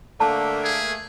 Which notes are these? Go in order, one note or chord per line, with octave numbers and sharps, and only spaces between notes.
D3 A3 A#3 A5
G#4